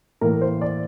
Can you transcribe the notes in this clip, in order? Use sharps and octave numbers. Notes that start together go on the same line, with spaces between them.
A2 E3 A#3 A#4
C5
D5